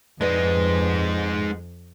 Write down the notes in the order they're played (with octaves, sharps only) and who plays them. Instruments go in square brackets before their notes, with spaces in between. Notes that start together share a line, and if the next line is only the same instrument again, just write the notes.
[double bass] F2 [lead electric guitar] G#3 D#4 [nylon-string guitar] B4 D5